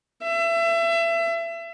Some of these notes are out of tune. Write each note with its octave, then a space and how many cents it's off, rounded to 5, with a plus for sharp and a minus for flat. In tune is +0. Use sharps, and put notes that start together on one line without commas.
E5 +30